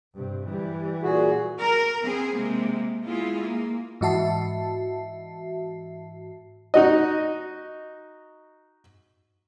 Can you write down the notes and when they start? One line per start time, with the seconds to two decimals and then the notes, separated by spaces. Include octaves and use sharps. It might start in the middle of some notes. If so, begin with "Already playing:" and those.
0.14 G2 C3
0.47 E3 G3
1.03 A#2 F#4 G#4
1.60 A#4
2.02 B3 C4 G#4
2.35 C3 G#3 A#3
3.04 G#3 B3 E4 F4 G#4
3.42 A#3
4.01 G#2 E3 F#4 E5 A5 C7
6.74 D#4 F#4 D#5